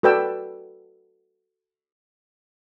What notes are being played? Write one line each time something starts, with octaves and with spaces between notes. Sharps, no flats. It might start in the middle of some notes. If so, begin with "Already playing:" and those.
F#4 A4 B4 D5 G5 E6